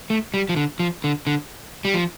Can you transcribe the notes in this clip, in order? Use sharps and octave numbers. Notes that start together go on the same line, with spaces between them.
A3
G3
F3
D3
F3
D3
D3
G3
F3